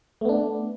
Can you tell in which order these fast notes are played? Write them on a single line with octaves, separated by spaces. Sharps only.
A3 B3 D4